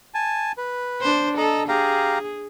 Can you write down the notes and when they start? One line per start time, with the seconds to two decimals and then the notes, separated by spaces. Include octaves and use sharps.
0.14 G#5 A5
0.58 B4
1.02 D4 C5
1.37 A4 D#5 A#5
1.68 G4 G#4 F5 A#5